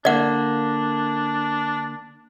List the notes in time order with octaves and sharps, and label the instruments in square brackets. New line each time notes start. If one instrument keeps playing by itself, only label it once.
[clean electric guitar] D3 A#3 [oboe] D4 [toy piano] D5 F#5